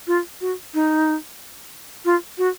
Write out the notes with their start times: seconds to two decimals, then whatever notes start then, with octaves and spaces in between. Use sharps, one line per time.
0.07 F4
0.41 F#4
0.74 D#4
2.05 F4
2.38 F#4